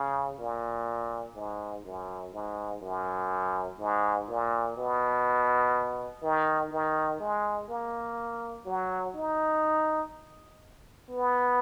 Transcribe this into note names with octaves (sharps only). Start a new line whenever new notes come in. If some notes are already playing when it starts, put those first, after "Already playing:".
Already playing: C#3
A#2
G#2
F#2
G#2
F#2
G#2
A#2
B2
D#3
D#3
G#3
A#3
F#3
D#4
B3